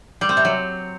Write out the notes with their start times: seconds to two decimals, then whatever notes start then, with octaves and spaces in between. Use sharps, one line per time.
0.21 G3
0.29 C4
0.37 C3
0.45 F#3